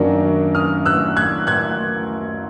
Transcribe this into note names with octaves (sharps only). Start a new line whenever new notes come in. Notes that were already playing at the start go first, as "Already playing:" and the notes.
Already playing: F#2 D#3 F#3 A#3 D4
D#6 F6
E6 F#6
F#6 G#6
F#6 G#6